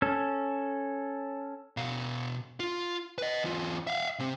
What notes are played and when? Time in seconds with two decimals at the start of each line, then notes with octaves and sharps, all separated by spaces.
0.02 C#4 A4
1.77 B2 F5
2.60 F4
3.18 B4 D#5
3.43 E2 F4
3.87 E5 F5
4.19 C3 C4